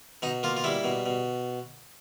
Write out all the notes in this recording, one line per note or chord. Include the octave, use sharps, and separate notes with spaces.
B2 D#4
A#3 F4
F4
G3 E4
B2
B2